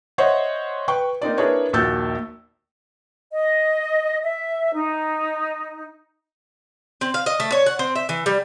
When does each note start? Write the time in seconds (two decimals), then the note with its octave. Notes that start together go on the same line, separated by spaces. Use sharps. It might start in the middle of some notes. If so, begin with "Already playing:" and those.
0.18 C5 C#5 D#5 E5 F#5
0.88 B4 G5 C#6
1.21 A#3 C4 D#4 D5
1.38 D4 E4 G#4 A#4 B4 C#5
1.73 A#1 D#2 F#4 E6 G6 A6
3.31 D#5
4.23 E5
4.74 D#4
7.01 C4
7.14 F5
7.26 D#5
7.40 A3
7.52 C#5
7.66 F#5
7.79 C4
7.96 E5
8.09 E3
8.26 G3